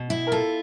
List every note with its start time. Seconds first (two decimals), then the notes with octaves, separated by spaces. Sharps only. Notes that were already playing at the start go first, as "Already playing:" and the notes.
Already playing: B2
0.10 E4
0.27 A#4
0.32 F4 A4